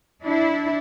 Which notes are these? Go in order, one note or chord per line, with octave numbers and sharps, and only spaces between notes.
D4 E4